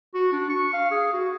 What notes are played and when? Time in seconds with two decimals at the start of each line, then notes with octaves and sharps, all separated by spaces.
0.15 F#4
0.32 D4
0.50 C#6
0.74 F5
0.91 G#4
1.13 F#4